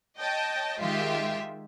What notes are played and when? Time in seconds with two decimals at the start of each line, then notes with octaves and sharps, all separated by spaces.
0.17 C#5 D#5 G5 A5
0.80 D#3 G#3 F4 G4 E5